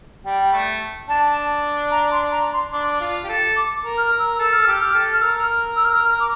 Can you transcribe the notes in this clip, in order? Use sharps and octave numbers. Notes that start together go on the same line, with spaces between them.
G3 G5
A3
D4 A5
A#5
C6
A#5
C6
D4 D6
F4
G4
A4
D6
A#4
F6
A#4
E6
A4 E6
F6
G4 E6
F6
A4
F6
A#4 E6
F6
E6
F6
F6
D6